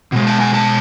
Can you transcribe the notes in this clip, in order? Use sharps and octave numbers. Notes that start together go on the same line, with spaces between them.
B2 G#3
A5
G#5
A5